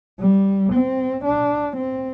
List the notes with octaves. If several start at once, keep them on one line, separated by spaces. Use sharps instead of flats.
G3
C4
D4
C4